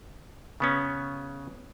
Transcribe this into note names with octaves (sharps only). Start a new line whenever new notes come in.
C#3 B3 C#4